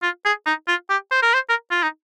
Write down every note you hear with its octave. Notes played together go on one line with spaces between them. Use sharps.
F4
G#4
D#4
F4
G4
C5
A#4
C5
A#4
F4
D#4